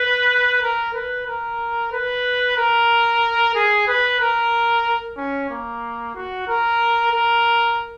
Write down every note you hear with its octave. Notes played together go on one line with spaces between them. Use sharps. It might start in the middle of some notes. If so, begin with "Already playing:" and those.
Already playing: B4
A#4
B4
A#4
B4
A#4
G#4
B4
A#4
C#4
A#3
F#4
A#4
A#4